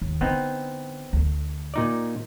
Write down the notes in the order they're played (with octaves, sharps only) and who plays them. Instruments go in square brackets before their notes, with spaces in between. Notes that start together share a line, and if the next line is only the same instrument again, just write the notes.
[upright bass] D#2
[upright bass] D3 [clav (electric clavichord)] B3 C4 D#4
[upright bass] D2
[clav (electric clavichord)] A#2 D#4 D5